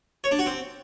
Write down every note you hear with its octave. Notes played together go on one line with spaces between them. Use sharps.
C#5
D4
F#4
C4